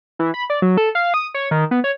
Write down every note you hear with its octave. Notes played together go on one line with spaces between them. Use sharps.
E3
B5
D5
F#3
A4
F5
D#6
C#5
D#3
B3
C#5